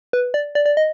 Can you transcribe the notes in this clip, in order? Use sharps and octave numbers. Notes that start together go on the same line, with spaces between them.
B4
D5
D5
D5
D#5